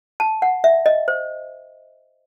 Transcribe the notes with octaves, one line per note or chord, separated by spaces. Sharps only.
A5
F#5
E5
D#5
C5